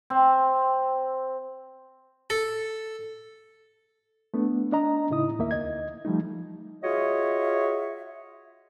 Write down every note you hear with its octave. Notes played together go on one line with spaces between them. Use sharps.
C4
A4
A3 B3 D4
D4 D#5 A#5
A2 C#3 D#4 E4 D#5 D#6
D#2 A#3 E5
D2 D#5 G#6
F3 G3 A3 D#4
F4 F#4 G#4 C#5 D#5 E5